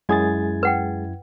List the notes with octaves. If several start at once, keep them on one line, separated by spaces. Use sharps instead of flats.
F#2 G#3 E4 G#4 G#6 A6
B4 F#5 G5